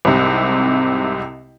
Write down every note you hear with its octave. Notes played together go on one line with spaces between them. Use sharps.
C2 G#2 C3